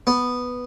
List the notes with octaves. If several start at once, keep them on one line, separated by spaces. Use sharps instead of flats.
B3